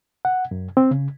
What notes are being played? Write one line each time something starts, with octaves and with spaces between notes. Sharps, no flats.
F#5
F#2
C4
C#3